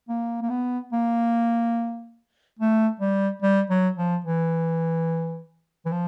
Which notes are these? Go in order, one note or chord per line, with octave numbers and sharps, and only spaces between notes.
A#3
A#3
B3
A#3
A3
G3
G3
F#3
F3
E3
E3
F3